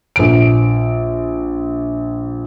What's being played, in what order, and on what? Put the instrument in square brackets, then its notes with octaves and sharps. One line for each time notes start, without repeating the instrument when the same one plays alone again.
[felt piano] A#1 D7